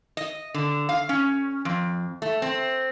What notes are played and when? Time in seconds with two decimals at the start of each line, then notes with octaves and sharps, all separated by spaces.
0.17 D#5
0.54 D3
0.89 F5
1.09 C#4
1.65 F2
2.22 A3
2.42 C4